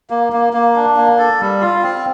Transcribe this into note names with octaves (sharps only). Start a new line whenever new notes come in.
A#3
A#3
A#3
D4
A#3
A4
G3
F4
C4